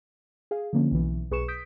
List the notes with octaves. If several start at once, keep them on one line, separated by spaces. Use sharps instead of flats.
G#4 F5
D3 F3 A#3 C#4
B1 E3
B1 G#4 B4 C#6 C#7 E7
D#6 G6 B6 D7